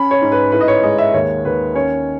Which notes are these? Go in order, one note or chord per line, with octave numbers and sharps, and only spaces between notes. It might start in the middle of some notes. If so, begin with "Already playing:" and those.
Already playing: C#4 B5
C#5
G#2
B4
A2 B4
D#5
C#5
G#3 D#5
E5
D#2 C#5
D#2 B4
C#4 C#5